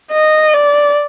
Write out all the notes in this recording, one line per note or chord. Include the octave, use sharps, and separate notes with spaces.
D#5
D5